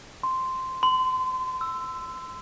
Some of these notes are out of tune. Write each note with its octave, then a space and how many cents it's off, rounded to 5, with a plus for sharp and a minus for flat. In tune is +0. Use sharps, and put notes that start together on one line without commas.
C6 -5
C6 -30
E6 +10